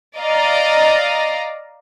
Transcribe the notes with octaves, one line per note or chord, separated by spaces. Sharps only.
D5 D#5 F5 A#5